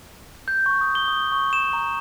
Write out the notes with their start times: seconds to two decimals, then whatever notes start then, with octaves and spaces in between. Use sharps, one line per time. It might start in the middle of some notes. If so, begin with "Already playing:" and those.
0.48 G6
0.66 C#6
0.81 D#6
0.95 G7
1.08 D#6
1.32 C#6
1.53 E7
1.73 A#5